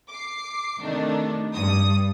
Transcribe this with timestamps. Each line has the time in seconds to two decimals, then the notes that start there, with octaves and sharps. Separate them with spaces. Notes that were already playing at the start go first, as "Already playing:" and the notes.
0.11 D6 C7
0.80 C3 D#3 A3 D4 D#4
1.54 G2 D#6